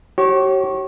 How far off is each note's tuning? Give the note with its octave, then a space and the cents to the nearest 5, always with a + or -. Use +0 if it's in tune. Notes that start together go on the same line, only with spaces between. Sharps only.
G4 -45 C#5 -25